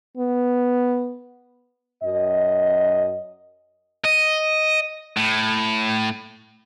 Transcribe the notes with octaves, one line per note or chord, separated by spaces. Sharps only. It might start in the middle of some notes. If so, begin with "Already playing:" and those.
B3
F#2 D#5
D#5
A2